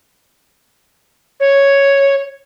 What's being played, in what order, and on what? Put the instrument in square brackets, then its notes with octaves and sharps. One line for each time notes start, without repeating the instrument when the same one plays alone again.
[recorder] C#5